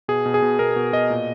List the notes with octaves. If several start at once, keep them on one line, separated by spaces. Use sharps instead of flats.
B2 G#4
B2
G#4
B2
B2 A#4
B2
B2 D#5
A#2